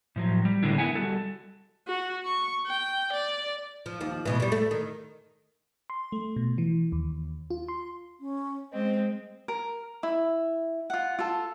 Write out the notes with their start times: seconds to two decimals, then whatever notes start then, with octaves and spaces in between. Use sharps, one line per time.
0.16 A2 F3 F#3
0.45 G3
0.63 A2 D3 G#3 A#3 D4 E4
0.78 B3 E4 E5 F#5 G#5
0.95 G3 F#4 A4
1.87 F#4
2.25 C#6
2.67 G5
3.13 D5
3.86 F3
4.01 D#2 F3
4.25 D2 B2 E3
4.40 B2 G3
4.52 A3
4.71 D#3
5.90 C6
6.12 A3
6.36 B2
6.58 E3
6.92 D#2
7.50 F4
7.68 C6
8.20 C#4
8.72 G#3 C4 D#5
9.48 A#4
10.03 E4
10.90 F4 F#5
11.19 F4 A4